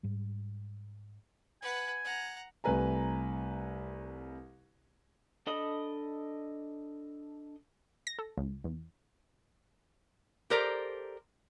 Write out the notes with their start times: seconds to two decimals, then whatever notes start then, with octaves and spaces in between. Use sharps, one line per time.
0.03 G#2 G3
1.62 B4 F#5 G#5
2.04 F#5 A#5
2.64 C2 A3 B4 G#5 A#5
5.47 D4 A4 D#5 B5 D#6
8.07 A#6
8.19 A4
8.38 C#2
8.64 E2
10.50 G4 A4 A#4 C5 D5 A#5